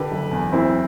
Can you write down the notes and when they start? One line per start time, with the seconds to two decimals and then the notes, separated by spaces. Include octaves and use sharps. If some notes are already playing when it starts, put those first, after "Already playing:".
Already playing: D3 G4 B4
0.11 F#1
0.31 E2
0.52 F#1 C4 E4